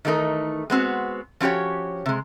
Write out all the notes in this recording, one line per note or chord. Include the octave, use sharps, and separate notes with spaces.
D#3 E3 A3 D#4 A#4
G#3 B3 C4 F#4
F3 C#4 F#4 G4 C#5
C3 G#3